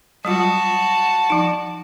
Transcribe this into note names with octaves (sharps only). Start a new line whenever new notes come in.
F#3 G3 F4 F#4 A5
F3 D#4